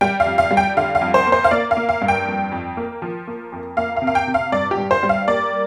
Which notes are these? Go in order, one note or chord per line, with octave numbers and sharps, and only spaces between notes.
G3 G5
F5
F2
F5
G3
G5
D3 F5
F5
F2
C5
A#3
C5
F5
A#3 D5
F5
A#3
F5
G2
G5
F2
F2
A#3
F3
A#3
F2
A#3 F5
F5
C3
F5
G5
C3
F5
G2 D5
G4
G2
C5
G3
F5
A#3 D5